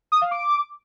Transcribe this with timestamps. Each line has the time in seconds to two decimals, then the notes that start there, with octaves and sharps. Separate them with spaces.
0.12 D#6
0.21 F5
0.31 D6